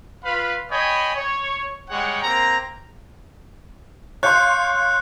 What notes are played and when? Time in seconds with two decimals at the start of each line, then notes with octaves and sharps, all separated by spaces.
0.24 F4 B4 F5 B5
0.71 C#5 D#5 G5 G#5 B5
1.15 C#5
1.90 G3 G#3 C#5 F#5 G5
2.23 A#3 C4 A#5
4.23 C#5 F5 C6 F#6 G6 C#7